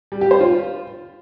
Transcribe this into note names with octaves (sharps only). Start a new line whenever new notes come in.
G3
G4
C5
F4